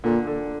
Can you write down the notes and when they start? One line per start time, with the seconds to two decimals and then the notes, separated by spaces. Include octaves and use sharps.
0.04 A#2 D3
0.27 D3